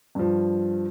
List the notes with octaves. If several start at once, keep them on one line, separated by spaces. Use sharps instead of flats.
G2 F3